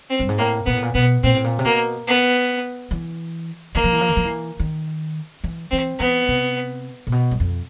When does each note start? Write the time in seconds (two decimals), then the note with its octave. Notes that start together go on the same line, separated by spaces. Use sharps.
0.10 C4
0.20 G2
0.29 G#2
0.38 A2 A#3
0.66 A#2 B3
0.74 A2
0.82 A#2
0.95 B2 B3
1.23 A#2 C4
1.34 A2
1.44 A#2
1.59 C3
1.65 B2 A#3
2.08 B3
2.91 E3
3.75 E3 A#3
3.84 F3
3.93 E3
4.01 F3
4.09 E3
4.17 F3
4.25 E3
4.60 D#3
5.44 E3
5.71 E3 C4
5.99 E3 B3
6.28 C3
7.07 A#2
7.12 B2
7.31 F#2
7.40 F2